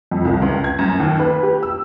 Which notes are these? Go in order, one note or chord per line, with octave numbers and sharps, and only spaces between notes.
F2
C2
C#2
G#6
F#2
D#2
B4
G4
E6